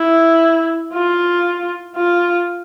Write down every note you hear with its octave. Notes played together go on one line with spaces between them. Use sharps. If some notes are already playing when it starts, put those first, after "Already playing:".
Already playing: E4
F4
F4